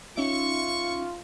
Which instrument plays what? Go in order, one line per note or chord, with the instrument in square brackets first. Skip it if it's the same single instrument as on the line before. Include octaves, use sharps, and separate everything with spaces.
[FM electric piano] C#4 D#4 E5 [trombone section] F4 [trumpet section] C#6